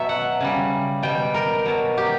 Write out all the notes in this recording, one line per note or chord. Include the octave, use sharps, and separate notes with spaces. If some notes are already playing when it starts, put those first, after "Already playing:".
Already playing: B2 F#3 E5
F#5
C#3 G3
B2 G3 G5
A#4
B2 F#3
G4